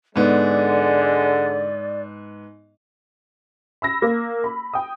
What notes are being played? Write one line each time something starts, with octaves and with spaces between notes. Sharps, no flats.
G#2 D3 G#3 B3 D5
B5 E6 A#6
A#3
B5
G5 D#6